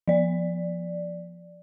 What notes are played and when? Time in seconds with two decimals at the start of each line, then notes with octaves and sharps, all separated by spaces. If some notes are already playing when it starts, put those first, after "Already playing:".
0.08 F3 D5